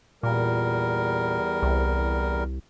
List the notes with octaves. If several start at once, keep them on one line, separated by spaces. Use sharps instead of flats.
E2 A#2 G3 A#4
C2